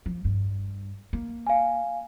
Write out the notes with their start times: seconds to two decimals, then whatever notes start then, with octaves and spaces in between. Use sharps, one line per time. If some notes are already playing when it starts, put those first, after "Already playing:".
0.06 F3
0.25 G2
1.13 A#3
1.47 F5 G#5